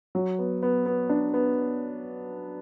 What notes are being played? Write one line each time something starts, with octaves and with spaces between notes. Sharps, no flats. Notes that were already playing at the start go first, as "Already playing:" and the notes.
F#3
B3
B3
B3
D4
B3